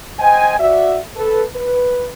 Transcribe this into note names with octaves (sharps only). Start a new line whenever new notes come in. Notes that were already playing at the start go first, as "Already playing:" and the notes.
C5 D#5 G5 G#5
F#4 D5 E5
A4 B4
B4